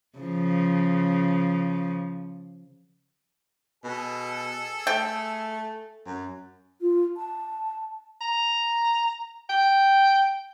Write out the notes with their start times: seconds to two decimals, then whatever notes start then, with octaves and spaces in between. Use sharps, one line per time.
0.18 C#3 F3
3.84 B2 G#4 A4
4.87 A3 G5
6.06 F#2
6.81 F4
7.17 A5
8.21 A#5
9.49 G5